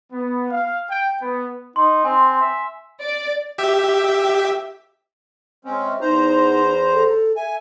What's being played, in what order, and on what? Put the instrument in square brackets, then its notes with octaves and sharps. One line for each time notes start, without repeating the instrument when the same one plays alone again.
[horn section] B3
F5
G5
B3
[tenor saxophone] D#4 [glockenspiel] C6
[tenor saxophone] C4 [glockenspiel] G#5 C6
[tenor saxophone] E5
[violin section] D5
[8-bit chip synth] G4 E5
[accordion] G#3 C4 C#4
[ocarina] E5
[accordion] E2 C5 A#5 [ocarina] D#4
[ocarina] A4
[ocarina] E5 [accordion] G#5